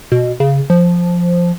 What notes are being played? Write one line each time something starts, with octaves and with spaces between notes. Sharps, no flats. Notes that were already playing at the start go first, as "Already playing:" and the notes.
B2
C#3
F3